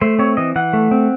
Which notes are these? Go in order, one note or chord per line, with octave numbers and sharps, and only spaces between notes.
A3 C5
C4 C#5
E3 D#5
E3 F#5
A3
C4